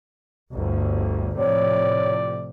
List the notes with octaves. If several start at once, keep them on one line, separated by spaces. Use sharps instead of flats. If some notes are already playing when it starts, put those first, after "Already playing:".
G1 D2
A2 C3 F3 C#5 D5